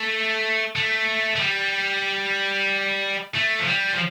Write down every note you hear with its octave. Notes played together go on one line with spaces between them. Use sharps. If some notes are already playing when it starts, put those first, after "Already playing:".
Already playing: A3
A3
A3
G3
A3
F3
G3
F3